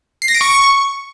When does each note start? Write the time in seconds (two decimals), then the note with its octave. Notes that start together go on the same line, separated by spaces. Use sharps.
0.22 C7
0.28 A#6
0.35 D7
0.41 C#6